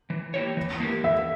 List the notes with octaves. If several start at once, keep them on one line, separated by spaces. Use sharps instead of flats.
E3
A#3 E4 G4 C#5
E3
A#3 E4 G4 A#4
E3 E5